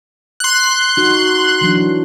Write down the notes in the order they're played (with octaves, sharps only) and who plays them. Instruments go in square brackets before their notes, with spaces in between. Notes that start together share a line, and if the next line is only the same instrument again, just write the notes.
[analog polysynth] C6 F#6
[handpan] D#4 F#4
E3 F#3 D4